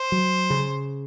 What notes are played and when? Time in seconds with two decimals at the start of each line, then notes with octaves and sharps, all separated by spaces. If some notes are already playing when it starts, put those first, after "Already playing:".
Already playing: C5
0.12 F#3
0.50 C#3